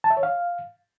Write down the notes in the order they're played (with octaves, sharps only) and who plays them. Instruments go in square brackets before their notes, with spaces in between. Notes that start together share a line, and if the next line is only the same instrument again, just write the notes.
[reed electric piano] A5
E5
C#5
F5